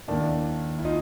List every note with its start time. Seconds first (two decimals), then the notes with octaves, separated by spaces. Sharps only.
0.08 D#2 D#3 D4 E4
0.79 E4
0.85 D#4 F4